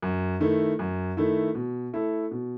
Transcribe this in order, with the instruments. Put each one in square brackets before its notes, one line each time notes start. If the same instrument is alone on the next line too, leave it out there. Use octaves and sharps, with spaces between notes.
[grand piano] F#2
D#3 A3 E4
F#2
D#3 A3 E4
B2
A3 E4 A4
B2